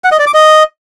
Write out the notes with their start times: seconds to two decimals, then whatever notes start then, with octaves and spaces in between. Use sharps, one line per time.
0.04 F#5
0.12 D#5
0.19 D5
0.27 D6
0.34 D#5